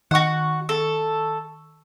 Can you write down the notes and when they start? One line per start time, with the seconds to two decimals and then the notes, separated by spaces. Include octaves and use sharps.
0.11 D#3 F#4 F#5 C#6
0.69 A4